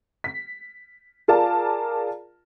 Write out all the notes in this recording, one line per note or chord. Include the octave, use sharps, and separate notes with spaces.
B6
F4 G#4 A#4 D5 A5